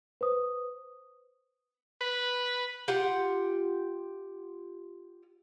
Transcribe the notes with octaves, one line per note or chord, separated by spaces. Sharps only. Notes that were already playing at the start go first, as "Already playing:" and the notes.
B4 C5 D#6
B4
F4 G4 F#5